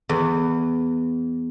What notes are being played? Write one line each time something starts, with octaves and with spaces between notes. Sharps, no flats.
E2